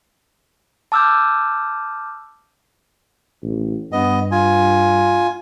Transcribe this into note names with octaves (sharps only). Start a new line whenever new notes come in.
A5 D6 E6 F6 G6
A1
G2 B3 D#5
F4 G#5